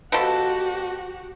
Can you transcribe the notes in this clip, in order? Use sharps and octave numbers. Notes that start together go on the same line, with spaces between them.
B2 F3 F#4 G4 A4 F#5